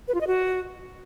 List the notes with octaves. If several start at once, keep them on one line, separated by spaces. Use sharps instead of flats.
B4
F4
D#5
F#4